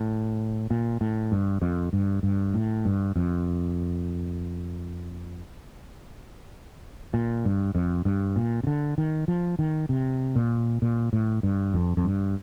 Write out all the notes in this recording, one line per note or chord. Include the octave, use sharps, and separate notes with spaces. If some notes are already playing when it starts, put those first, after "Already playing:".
Already playing: A2
A#2
A2
G2
F2
G2
G2
A2
G2
F2
A#2
G2
F2
G2
A#2
C3
D3
D#3
F3
D#3
C3
A#2
A#2
A2
G2
F2
F2
G2